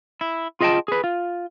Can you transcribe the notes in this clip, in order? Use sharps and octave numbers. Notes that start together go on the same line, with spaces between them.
E4
F4 G#4 D#5 F5 G5 A5
G#4 B4
F4